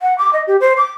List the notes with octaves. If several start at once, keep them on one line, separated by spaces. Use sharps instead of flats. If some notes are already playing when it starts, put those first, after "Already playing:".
F#5
D6
D#5
G4
C5
D6